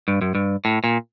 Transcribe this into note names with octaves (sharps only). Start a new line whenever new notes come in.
G2
F#2
G2
A2
A#2